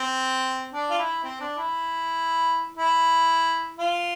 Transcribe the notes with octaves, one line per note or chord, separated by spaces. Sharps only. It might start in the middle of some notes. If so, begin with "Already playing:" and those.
Already playing: C4
D4
F4
E4
C4
D4
E4
E4
F4